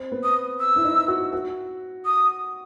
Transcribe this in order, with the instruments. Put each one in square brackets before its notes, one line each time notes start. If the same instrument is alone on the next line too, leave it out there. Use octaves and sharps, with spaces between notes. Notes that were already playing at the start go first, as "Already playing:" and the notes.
Already playing: [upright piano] C4
B3
[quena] D#6
E6
[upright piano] E4
D#4
F#4
F#4
[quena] D#6